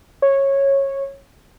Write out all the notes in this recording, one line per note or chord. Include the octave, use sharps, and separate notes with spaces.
C#5